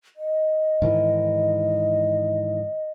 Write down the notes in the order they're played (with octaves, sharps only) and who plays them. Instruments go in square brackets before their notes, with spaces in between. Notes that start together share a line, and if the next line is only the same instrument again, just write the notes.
[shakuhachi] D#5
[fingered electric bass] G#2 D#3 E3